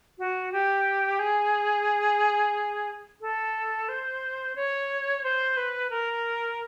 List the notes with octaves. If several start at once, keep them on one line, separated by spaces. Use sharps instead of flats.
F#4
G4
G#4
A4
C5
C#5
C5
B4
A#4